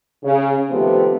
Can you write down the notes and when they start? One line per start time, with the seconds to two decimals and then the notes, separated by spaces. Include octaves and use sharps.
0.24 C#3
0.70 D#2 C3 F3 A3 B3 C4